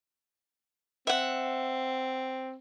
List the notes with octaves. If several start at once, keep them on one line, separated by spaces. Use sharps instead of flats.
C4 E5 F#5